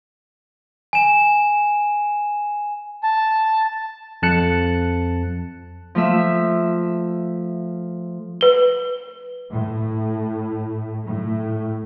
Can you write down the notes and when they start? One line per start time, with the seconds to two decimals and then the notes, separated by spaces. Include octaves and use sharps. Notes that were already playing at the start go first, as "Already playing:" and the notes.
0.93 G#5 E7
3.03 A5
4.22 F2 A5 F#6 C#7
5.95 F3 A3 E5
8.41 B4 G7
9.50 A2
11.06 A2